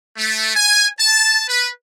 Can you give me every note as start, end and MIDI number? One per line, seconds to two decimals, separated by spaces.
0.17 0.52 57
0.56 0.86 80
0.99 1.42 81
1.49 1.69 71